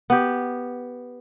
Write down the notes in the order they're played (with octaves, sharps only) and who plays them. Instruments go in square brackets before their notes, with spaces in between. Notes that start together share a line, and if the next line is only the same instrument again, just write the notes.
[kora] B3 G4